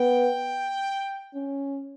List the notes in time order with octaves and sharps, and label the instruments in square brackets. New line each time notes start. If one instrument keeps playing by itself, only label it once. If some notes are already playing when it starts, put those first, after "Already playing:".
Already playing: [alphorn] B3 [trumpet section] G5
[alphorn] C#4